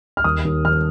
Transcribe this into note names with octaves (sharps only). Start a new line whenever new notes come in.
F6
D#2 D#6
D#2
D#3 F6